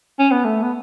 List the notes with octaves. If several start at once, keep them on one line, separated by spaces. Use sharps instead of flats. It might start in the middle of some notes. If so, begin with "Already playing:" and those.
C#4
B3
A3
B3